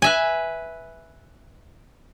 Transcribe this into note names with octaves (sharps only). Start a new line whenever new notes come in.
B4 E5 G#5